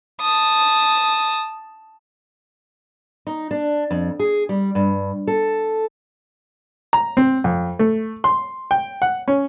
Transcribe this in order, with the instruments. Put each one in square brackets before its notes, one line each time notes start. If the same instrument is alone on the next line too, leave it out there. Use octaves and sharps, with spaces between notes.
[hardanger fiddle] A5 D#6
[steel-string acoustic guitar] D#4
D4
F2
G#4
G3
G2
A4
[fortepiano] A#5
C4
F2
A3
C6
G5
F#5
C#4